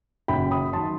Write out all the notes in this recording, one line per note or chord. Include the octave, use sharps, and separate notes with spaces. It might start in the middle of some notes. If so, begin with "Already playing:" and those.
F#1 F#2 F#3 G5 B5
B5 D#6
D#3 F#3 A5 C6